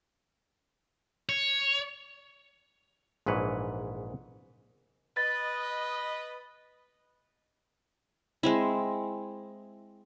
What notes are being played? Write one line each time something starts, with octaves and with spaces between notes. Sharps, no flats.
C#5
A#1 G#2 E3 B4 C#5
B4 D#5 A6
G#3 C4 E4